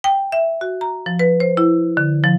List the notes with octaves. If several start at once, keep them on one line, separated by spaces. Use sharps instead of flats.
G5
E5
F#4
A#5
F3
B4
C5
E4
D3
F3